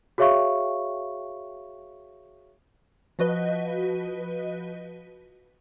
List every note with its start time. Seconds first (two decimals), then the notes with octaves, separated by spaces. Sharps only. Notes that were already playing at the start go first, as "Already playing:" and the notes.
0.18 F#4 G#4 C#5 E5 F5 C#6
3.19 F3 F#4 B4 D#5